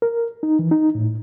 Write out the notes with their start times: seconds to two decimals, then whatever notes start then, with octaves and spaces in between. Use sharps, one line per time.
0.02 A#4
0.43 D#4
0.59 E3
0.71 D#4
0.95 A2